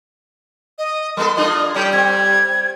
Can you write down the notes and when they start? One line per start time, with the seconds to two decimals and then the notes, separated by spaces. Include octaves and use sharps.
0.78 D#5
1.17 G3 B3 A4 A#4 C6
1.37 D4 F4 G#4 D#5
1.75 G3 C#4 A4 G5
1.93 C4 G#6